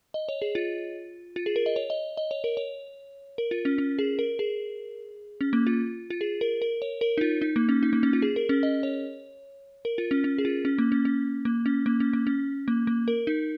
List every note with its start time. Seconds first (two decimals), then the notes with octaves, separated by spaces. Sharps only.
0.14 D#5
0.29 C#5
0.42 G#4
0.55 F4
1.36 F4
1.46 G#4
1.56 A#4
1.66 D#5
1.76 C#5
1.90 D#5
2.17 D#5
2.31 C#5
2.44 A#4
2.57 C#5
3.38 A#4
3.51 F4
3.65 C#4
3.78 C#4
3.99 G#4
4.19 A#4
4.39 G#4
5.41 C#4
5.53 A#3
5.67 F4
6.10 F4
6.21 G#4
6.41 A#4
6.62 A#4
6.82 C#5
7.01 A#4
7.18 D#4
7.21 F4
7.42 D#4
7.56 A#3
7.69 C#4
7.83 D#4
7.93 A#3
8.03 C#4
8.13 F4
8.22 G#4
8.36 A#4
8.49 C#4
8.63 D#5
8.83 C#5
9.85 A#4
9.98 F4
10.11 C#4
10.24 C#4
10.38 G#4
10.45 F4
10.65 C#4
10.78 A#3
10.92 C#4
11.05 C#4
11.45 A#3
11.66 C#4
11.86 A#3
12.00 C#4
12.13 A#3
12.27 C#4
12.68 A#3
12.87 A#3
13.08 A#4
13.27 D#4